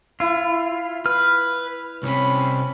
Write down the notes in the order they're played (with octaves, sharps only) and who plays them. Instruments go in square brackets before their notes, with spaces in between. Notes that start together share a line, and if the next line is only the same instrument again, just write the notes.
[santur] E4 [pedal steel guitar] F4
[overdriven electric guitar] B4 [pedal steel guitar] F6
[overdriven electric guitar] C2 C3 [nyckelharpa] C#4 B5